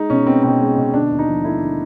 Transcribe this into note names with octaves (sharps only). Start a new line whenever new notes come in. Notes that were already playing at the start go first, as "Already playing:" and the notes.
Already playing: G#3 D#4
B2 C#4
B3 C4
B2 C4
G#3
B2
D3 D4
D#2
D#4
F3
A3 E4
D3